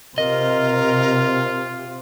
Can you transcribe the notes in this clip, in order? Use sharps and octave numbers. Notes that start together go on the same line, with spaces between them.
C3 F4 A#4 D#5